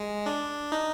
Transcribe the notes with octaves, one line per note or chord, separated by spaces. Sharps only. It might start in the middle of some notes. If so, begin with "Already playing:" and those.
Already playing: G#3
D4
D#4